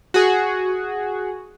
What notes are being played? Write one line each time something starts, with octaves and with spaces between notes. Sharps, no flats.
F#4 G#4